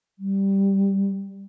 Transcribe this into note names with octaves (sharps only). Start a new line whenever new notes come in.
G3